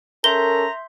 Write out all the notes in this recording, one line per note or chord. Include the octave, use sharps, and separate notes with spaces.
C#4 A4 A#4 E5 A#5 C6 G6 G7